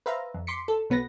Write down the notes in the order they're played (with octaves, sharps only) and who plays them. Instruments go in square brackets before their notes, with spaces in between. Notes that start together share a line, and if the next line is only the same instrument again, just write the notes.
[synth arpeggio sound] B4 C5 E5 F5 A#5
F2
C6 D6 B6 C#7
A4
B1 B3 B4 A#6